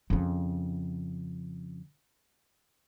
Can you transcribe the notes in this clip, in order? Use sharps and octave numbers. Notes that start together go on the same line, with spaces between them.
F2 C#3